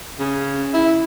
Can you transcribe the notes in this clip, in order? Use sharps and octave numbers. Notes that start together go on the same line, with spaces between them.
C#3
E4